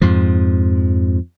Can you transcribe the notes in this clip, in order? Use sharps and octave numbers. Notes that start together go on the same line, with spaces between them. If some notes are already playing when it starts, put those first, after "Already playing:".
F2 G#2 F3